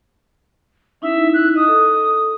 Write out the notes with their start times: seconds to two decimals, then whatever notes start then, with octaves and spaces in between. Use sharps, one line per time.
1.02 C#4 D#4 E4 E5
1.33 F#6
1.56 D#5 D#6
1.68 A4